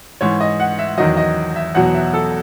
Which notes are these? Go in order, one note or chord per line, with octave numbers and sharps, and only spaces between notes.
G#2 E3 C#5
D#5
F#5
E5
E2 D#3 F#3 D#5
D#5
E5
E2 B2 F#3 F#5
E5
A4